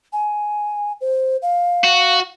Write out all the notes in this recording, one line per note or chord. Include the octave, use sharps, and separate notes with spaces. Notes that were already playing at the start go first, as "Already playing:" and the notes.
G#5
C5
F5
F#4